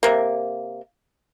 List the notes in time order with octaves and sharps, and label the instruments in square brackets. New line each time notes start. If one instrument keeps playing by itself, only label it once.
[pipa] C3 A#3